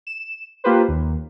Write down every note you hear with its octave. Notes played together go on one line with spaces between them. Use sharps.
E7
A#3 F4 G4 B4 C5
D#2